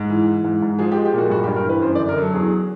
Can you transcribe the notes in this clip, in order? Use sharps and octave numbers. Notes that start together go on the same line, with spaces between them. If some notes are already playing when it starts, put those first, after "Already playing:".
Already playing: G#2
E3
E3
G#2
G#2
F3 G#4
G4
G#3
G4
A#2 F#4
G2 F#4
G4
G2
A#4
E3 B4
F#2 C5
D5
D3
A#4
F#3 A4
E2 G#4